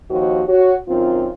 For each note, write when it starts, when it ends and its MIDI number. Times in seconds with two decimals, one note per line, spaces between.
0.11 0.42 39
0.11 0.42 53
0.11 0.42 66
0.11 0.42 67
0.11 0.42 72
0.11 0.42 75
0.48 0.76 66
0.48 0.76 73
0.88 1.29 42
0.88 1.29 51
0.88 1.29 60
0.88 1.29 65